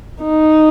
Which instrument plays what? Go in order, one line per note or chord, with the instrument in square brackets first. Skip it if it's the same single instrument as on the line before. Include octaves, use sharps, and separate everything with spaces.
[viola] D#4